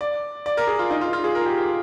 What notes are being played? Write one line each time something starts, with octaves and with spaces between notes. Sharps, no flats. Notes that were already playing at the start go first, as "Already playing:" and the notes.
D5
D5
A#4
G#4
F4
D#4
F4
F4
G#4
A#4
G4
F4